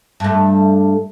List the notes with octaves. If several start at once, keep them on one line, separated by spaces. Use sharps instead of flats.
G2 A3